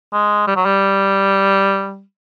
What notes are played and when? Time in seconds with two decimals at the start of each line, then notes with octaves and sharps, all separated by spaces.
0.13 G#3
0.47 G3
0.56 F#3
0.65 G3